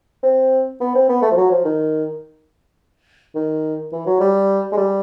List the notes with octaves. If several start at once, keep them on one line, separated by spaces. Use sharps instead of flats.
C4
B3
C4
B3
A3
F3
F#3
F3
D#3
D#3
E3
F#3
G3
G#3
G3